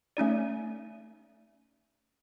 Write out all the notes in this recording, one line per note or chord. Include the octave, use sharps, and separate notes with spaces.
A3 C#4 D#4 D5